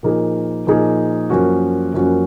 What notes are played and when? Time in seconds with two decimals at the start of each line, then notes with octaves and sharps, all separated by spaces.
0.03 A#2 F3 A#3 D#4 G#4
0.67 A#2 F3 A#3 D#4 G#4
1.30 F#2 F3 A#3 C#4 F#4
1.94 F#2 F3 A#3 C#4 F#4